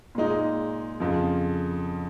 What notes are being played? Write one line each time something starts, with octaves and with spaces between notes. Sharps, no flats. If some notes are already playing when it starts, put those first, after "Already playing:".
A#2 G#3 D#4
F2 C#3 F3